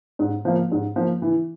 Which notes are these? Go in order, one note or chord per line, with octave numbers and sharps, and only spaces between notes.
G#2
F3 A#3
G#2
F3 A#3
E3